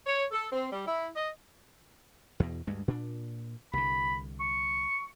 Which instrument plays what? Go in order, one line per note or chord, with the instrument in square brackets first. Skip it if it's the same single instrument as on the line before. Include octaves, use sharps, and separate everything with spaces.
[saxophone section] C#5
A4
C4
G3
E4
D#5
[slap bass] E2 B2
D2 G2 G#3
A#2 D4
[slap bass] C2 D3 [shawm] B5
[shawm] C#6